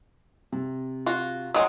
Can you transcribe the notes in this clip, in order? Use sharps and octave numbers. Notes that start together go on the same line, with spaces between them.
C3
F4 F#4
F#3 G#3 C4 D#5 F#5 D#6